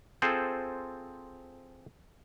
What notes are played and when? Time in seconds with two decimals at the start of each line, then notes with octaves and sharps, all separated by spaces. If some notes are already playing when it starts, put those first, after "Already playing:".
0.22 C4 F4 G#4 A4 C5